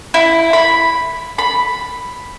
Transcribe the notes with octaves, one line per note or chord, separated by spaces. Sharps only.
E4
B5
B5